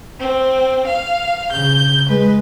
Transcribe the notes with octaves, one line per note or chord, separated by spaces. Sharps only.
C4
F5
C#3 G6
G#3 B4